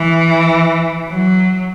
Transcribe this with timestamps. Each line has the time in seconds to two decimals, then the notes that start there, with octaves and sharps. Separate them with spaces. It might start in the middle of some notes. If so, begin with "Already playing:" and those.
Already playing: E3
1.09 F#3